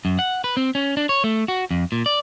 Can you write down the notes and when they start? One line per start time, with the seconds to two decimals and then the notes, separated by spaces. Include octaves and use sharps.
0.05 F#2
0.19 F#5
0.44 B4
0.57 C4
0.75 C#4
0.97 D4
1.09 C#5
1.24 A3
1.48 F#4
1.71 F2
1.92 A#2
2.06 D5